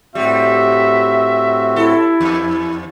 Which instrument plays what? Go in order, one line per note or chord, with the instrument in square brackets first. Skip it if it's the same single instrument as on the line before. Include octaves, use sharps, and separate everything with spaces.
[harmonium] A2 C4 F#4 [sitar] G3 [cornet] E5
[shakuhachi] E4 [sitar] A4
[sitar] E2